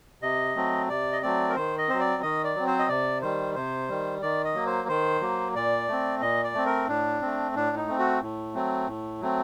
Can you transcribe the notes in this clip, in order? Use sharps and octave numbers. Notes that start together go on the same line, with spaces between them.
C3 D#5
F#3 A3 C4
C3 D5
D#5
F#3 A3 C4 D5
A#4
D#3 C5
D#5
F#3 C4 C5
D5
D#3 D#5
D5
F#3 C4
C5
D#5
C3 D5
D#3 G3 C5
C3 C5
D#3 G3
D#3 D5
D#5
F#3 A#3
C5
D#3 C5
F#3 A#3
A#2 D5
A3 C4
A#2 D#5
D5
A3 C4
A#4
A2 D4
A3 C4
A2 D4
D#4
A3 C4
F#4
A2
F#3 A3 C4
A2
F#3 A3 C4